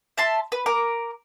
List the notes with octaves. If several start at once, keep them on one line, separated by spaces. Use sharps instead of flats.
E5 A5 C6
B4
A#4 D6